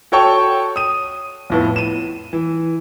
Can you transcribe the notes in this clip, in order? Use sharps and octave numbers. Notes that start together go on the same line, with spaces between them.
F#4 A4 C#5 G5 A5 C#6
D#6 D#7
F2 A2 B3
D#7 E7
E3